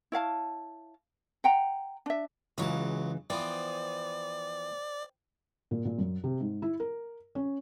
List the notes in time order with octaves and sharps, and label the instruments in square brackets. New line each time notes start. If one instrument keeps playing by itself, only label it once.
[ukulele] E4 C#5 F5 A5
F#5 G5 A#5
D4 E5
[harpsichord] C#2 F#3 A5 [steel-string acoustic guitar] C#3 E3
[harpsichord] E3 F3 B3 [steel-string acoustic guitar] C5 G5 [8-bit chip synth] D5
[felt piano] A#2
A#2
F#2
C3
G#2
E4
A#4
C#4